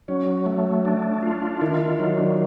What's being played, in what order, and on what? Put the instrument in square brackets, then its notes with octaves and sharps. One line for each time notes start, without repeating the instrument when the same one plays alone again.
[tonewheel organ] F#3 [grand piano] C#4
[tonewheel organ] A3
D4
F4
[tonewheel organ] D#3 [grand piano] E4
[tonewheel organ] F#3 [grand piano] D#4
[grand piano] D4